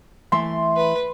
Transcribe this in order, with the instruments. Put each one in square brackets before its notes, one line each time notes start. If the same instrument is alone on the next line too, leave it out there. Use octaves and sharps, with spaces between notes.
[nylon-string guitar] E3 A3 E5 [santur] C6
[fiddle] B4